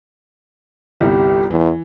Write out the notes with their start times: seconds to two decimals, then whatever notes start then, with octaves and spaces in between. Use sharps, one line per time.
1.01 G1 C2 G3 G4
1.51 E2 E3